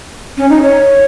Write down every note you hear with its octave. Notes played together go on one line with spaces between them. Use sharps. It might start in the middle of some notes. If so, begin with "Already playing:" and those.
C#4
D#4
C#5